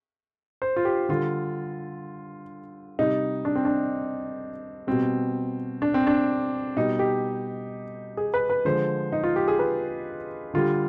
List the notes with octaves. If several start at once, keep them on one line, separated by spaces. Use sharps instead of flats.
C5
F4
G4
D3 G3 F4
C3 G3 D#4
D4
C4
D4
B2 G3 C4
D4
C4
D4
B2 G3 D#4
G4
G#4
B4
B4
D3 F3 G#3 C5
D#4
F4
G4
G#4
B4
D3 G3 F4